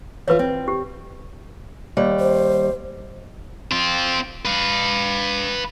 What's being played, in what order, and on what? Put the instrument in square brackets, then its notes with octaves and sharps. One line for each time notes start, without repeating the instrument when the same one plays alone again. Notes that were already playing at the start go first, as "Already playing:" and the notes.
[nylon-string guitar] E3 F4 [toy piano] B4 C#5
[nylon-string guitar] C4
[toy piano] G4
[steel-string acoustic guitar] D#2 G3
[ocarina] C5
[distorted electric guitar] C4 F4
B4 F5